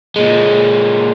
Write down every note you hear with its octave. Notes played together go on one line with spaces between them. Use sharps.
A#2 G#3